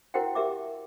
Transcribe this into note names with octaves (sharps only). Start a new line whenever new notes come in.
E4 F#4 A#4 C5 F#5 G5
G4 A#4 E5 D6